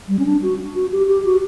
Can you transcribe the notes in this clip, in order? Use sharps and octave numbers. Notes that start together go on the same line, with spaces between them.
G3
C#4
D4
F#4
F#4
G4
G4
F#4